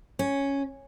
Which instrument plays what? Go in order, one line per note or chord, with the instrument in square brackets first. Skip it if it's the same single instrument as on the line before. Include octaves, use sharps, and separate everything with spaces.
[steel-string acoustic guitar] C#4